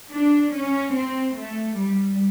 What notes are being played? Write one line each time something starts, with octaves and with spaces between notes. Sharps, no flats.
D4
C#4
C4
A3
G3